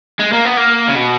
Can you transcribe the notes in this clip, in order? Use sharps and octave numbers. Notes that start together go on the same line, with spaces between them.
G#3
A#3
B3
A#3
C#3
B2